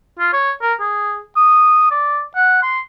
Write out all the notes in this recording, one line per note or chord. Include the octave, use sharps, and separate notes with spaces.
F4
C#5
A#4
G#4
D#6
D5
F#5
C6